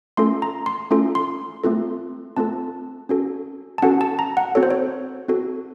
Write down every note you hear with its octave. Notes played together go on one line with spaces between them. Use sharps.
A3 C#4 F4 A4 C6
A#5
C6
A3 C#4 F4 A4
C6
A3 C4 F4 A4
A3 C4 F4 A4 A5
C#4 F#4 A4
A5
C#4 F#4 A4 F#5
A5
A#5
F#5
C4 F#4 A4 C#5
C5
C#5
C4 F#4 A4